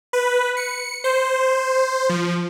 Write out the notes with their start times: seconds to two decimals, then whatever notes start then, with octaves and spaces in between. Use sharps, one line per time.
0.13 B4
0.57 C#7
1.04 C5
2.09 F3